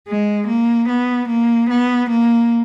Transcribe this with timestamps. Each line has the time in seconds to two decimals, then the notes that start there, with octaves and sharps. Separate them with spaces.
0.09 G#3
0.48 A#3
0.89 B3
1.29 A#3
1.70 B3
2.10 A#3